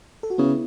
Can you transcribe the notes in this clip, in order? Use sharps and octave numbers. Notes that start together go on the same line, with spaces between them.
A4
F#4
C#3 B3 E4